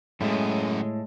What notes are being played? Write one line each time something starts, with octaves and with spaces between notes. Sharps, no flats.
F#2 A2 C#3 G#3